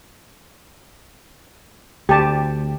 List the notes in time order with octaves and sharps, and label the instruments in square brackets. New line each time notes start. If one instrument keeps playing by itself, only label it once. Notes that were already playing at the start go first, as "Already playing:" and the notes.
[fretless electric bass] D2 [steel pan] G4 A5